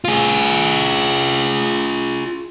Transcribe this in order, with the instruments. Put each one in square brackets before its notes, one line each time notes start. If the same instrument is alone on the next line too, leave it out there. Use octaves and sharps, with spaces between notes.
[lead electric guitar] F4 G#4